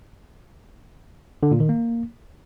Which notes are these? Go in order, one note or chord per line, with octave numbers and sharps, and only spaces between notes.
D3
A#2
D#3
A#3